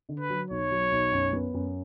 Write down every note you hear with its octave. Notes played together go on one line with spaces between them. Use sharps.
D3
B4
F#3
B1 C#5
F#3
B1
F#2
B3
F#2